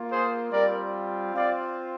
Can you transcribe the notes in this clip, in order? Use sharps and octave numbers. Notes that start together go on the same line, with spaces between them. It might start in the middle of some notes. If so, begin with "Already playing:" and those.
Already playing: A#3 F4
G#4 C5
G3 C4 F4 A#4 D5
C4 F4 D5 F5